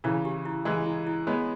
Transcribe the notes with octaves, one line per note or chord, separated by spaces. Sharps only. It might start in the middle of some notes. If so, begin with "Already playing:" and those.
C#3 E3 E4
G4
E4
E3 G#3 E4
E4
E4
G#3 B3 C#5